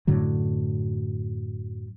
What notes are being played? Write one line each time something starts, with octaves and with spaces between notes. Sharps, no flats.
F#2 A2 D3 F#3